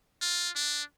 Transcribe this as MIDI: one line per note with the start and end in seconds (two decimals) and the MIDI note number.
0.22 0.50 65
0.56 0.83 62